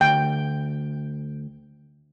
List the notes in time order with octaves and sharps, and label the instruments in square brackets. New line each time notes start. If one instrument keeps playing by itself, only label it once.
[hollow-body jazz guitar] D2 [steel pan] G5